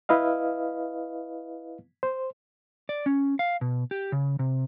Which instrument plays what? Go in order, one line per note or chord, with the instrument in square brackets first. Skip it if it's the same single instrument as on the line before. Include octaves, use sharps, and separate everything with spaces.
[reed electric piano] E4 B4 D#5 F5
C5
[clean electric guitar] D5
C#4
F5
B2
G4
C#3
C3